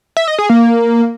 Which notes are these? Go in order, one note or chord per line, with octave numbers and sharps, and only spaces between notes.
E5
D#5
G#4
A#3